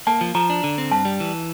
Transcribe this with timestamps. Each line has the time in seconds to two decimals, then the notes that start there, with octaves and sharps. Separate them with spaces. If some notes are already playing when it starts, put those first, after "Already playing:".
0.07 A#3 A5
0.21 F3
0.35 F3 A#5
0.50 D4
0.64 D3
0.78 C4
0.91 G2 A5
1.05 G3
1.20 E3